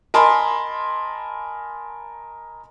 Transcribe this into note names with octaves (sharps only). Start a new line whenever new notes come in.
A#4 D#5 G#5 A5 B5 C6